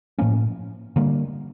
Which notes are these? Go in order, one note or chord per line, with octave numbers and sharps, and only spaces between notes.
A2 F3 A#3 C#4
D3 G3 A#3